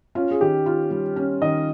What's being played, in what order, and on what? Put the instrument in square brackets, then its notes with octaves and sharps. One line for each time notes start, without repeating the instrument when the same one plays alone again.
[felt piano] C#4 [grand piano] F4
[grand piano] G#4
[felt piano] D#3 [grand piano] G4
[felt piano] F4
G3
C#4
[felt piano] D#3 [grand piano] D#5